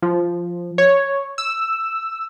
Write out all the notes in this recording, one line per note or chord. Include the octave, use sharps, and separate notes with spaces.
F3
C#5
E6